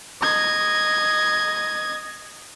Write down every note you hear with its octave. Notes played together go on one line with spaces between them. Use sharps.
D#5 G#6